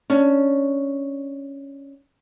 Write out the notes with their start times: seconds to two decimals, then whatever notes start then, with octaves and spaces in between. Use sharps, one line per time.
0.10 C#4 D4